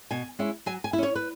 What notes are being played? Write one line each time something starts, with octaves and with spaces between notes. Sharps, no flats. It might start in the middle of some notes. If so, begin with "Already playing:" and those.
B2 G#5
G#3 C#4 E4
F#3 G#5
G#5
E4
C#4 C#5
B4